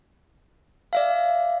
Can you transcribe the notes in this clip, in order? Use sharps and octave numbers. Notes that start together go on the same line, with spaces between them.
D5 E5 F5